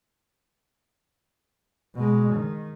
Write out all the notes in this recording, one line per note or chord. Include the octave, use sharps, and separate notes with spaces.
B2 G#3
D#3